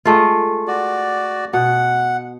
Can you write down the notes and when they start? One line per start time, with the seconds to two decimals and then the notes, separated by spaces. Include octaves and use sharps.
0.05 G#3 A3 F4
0.68 F#4 D5
1.53 B2 F#5